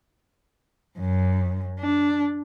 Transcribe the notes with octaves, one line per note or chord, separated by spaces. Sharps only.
F#2
D4